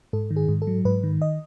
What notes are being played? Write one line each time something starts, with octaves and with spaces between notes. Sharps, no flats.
G#2 A4
D#3
G#4
G#2
A4
F#3
G#2 B4
D#3
D#5